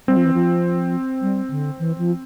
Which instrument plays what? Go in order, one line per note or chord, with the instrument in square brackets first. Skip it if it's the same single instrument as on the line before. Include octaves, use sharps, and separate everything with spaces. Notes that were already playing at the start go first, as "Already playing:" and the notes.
[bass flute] G3 [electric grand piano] C4
[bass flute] F3
E3
F3
G3
D3
E3
F3